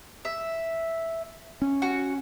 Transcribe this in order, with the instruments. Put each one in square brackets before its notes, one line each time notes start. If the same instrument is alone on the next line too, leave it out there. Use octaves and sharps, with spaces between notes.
[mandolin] E5
[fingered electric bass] C#4
[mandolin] F#4